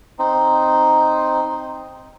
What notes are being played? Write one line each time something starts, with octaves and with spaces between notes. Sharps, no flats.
C4 D#4